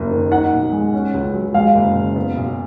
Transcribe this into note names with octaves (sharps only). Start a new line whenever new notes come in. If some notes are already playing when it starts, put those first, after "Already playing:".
Already playing: F#1 A#3
D#3
D#4 F#5
B1
G#3
C#4
C#2
F#3
G#3 F5
F#1
C#3
B3
B1